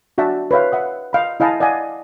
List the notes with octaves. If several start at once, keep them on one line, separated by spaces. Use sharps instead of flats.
D4 F#4 D5 E5 A5
B4 C#5 E5 F5
E5 F#5 D#6
D#5 F5 B5
E4 D#5 F5 G#5 A5 B5
D5 D#5 F5 F#5 G#5